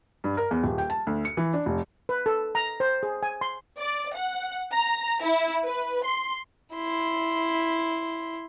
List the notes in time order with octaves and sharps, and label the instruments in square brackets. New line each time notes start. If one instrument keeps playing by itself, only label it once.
[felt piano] G2
A#4
E2
D#1
G5
A5
D2
C#7
E3
D4
F1
[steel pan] B4
A4
A#5
C5
G#4
G#5
C6
[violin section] D5
F#5
A#5
E4
B4
C6
[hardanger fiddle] E4 C6